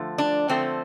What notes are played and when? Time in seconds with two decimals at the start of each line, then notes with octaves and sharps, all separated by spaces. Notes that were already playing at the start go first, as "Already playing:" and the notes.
Already playing: D3 F3 A3
0.18 D4
0.49 D3 F3 A3 C4